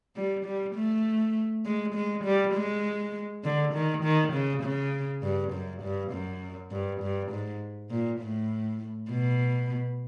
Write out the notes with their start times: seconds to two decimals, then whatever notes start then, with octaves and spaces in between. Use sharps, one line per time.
0.16 G3
0.45 G3
0.75 A3
1.65 G#3
1.95 G#3
2.24 G3
2.54 G#3
3.44 D3
3.74 D#3
4.03 D#3
4.33 C#3
4.63 C#3
5.23 G2
5.52 F#2
5.82 G2
6.12 F#2
6.72 G2
7.01 G2
7.31 G#2
7.90 A#2
8.21 A2
9.10 B2